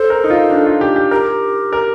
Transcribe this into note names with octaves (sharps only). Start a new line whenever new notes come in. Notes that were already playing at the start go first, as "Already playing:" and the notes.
Already playing: A4 C5
A#4
D#4
F4
D4
F4
G4
G4
G4 A#4
A#4